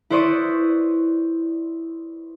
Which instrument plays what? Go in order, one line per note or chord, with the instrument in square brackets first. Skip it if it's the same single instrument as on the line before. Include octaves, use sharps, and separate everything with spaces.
[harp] E4 B4 C5 D5 C#6 D#6